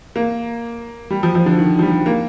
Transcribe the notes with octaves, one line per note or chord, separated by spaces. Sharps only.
A#3
G3
F3
F3
D3
D#3
F3
G3
A#3